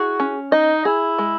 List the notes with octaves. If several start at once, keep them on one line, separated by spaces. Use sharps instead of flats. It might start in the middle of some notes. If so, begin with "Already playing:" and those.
Already playing: E4 F#4 G#4
C#4
D#4 D#5
E4 G#4
G#3